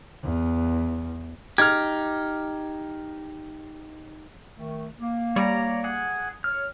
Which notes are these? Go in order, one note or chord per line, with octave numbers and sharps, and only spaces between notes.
E2
D#4 G4 F6 G#6
D#3 A3
A#3
G3 C#5 D5 A#5
G#4 F#5
C#5 F6